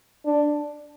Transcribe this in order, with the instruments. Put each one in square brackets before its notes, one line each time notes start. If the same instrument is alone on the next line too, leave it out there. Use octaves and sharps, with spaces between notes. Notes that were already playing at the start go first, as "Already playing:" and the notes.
[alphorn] D4